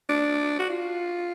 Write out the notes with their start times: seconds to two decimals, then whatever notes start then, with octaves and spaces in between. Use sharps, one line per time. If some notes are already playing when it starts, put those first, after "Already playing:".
0.09 D4
0.59 F#4
0.70 F4